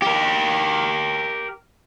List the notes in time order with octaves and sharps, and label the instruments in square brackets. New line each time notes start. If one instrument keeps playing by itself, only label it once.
[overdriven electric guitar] G4 A#4